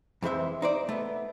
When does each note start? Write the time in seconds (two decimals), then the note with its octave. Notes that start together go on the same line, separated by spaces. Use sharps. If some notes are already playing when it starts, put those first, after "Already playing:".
0.22 F2 E3 G#3 C5 E5
0.62 D#4 C5 D5
0.89 A3 B3